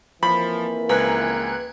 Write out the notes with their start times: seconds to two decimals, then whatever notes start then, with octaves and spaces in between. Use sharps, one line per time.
0.23 F2 E3 F3 A#3 B5
0.89 C#2 B4 G#5 A#5 F#6 G#6